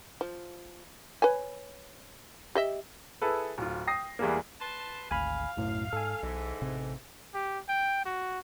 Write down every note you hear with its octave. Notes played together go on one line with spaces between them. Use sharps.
F3
B4 C#5 G#5
G4 D#5 E5
E4 G#4 A4 B4
D1 F4
G5 D#6 A#6 C7
E2 E3 G3 G#3 A#3
B4 A5 C6
G#1 D2 F5 G#5 B5
B1 F#2 A2
G#2 A4 G#5
B1 G#2 E3
A1 C3 C4
G4
G5
F#4